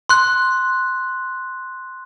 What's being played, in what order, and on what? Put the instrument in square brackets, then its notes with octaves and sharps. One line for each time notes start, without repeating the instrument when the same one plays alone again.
[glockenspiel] C6 F#6